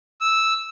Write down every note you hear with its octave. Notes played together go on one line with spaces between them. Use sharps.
E6